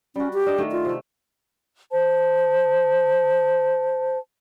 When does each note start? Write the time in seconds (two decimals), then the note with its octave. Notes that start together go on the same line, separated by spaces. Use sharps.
0.16 G3 C#4 F#4
0.33 G4
0.46 D4 D#5
0.58 D#3 A3
0.72 F4
0.85 C3 A3
1.91 C5 A5